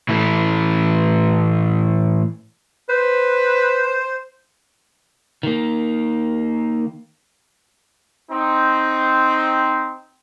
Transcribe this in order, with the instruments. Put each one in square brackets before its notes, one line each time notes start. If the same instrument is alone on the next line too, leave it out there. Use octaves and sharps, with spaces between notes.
[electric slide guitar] A2 E3 A3 E4
[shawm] B4 [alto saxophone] C5
[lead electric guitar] D#3 A#3
[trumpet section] C4 D#4